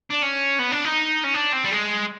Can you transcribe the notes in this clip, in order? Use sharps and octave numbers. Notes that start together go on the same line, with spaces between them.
D4
C#4
B3
D4
D#4
C#4
D4
C4
G3
G#3